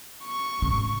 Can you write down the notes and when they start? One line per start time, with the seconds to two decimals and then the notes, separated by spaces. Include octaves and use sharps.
0.25 C#6
0.62 G#1 C#3